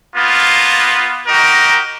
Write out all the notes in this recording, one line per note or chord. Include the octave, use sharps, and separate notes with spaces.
A#3 B3 F4
D#4 F#4 G4 A#4